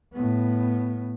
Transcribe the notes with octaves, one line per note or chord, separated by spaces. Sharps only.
A2 B3